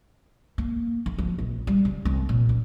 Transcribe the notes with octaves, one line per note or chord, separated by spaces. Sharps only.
A#3
D3
F3
A#1
G3
C#3
C2
A#2
F#2